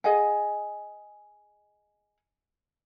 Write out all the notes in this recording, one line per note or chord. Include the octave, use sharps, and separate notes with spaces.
G#4 D#5 F#5 G#5